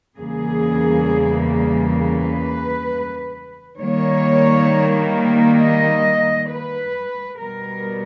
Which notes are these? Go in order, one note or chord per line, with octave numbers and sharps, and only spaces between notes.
E2 C#3 G3 A#3 G#4
B4
D#3 G3 A#3 C#5
D#5
B4
B2 G3 B3 A#4